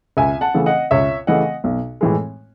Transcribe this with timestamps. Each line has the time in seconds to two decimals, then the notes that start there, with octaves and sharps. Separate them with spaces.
0.17 C#2 E5 G#5
0.41 F#5 A5
0.54 C#3 E3 A3
0.66 D#5 F#5
0.91 C#2 C#5 E5
1.27 C#3 E3 A3 D#5 F#5
1.64 B1
2.01 A2 E3 G#3